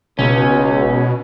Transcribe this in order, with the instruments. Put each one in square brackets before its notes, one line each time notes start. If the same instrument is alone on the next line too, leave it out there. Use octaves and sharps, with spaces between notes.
[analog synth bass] F#1 [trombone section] C#2 [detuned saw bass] B2 [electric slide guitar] C#4